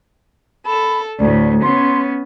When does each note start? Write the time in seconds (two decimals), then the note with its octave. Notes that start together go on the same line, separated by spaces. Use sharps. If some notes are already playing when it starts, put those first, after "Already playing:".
0.66 A4 B5
1.19 D2 A2 D5
1.63 B3 C#4 C6